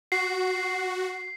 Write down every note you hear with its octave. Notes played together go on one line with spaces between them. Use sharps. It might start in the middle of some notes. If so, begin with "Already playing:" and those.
F#4 C7